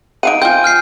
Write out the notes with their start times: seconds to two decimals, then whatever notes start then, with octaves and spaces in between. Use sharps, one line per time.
0.23 D#4 F5 F#5 D7 D#7
0.42 C4 F4 G#5 G6
0.64 F6 G6 C7